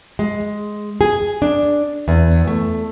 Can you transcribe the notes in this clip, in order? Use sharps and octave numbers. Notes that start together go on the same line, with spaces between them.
G#3
G#4
D4
E2
A3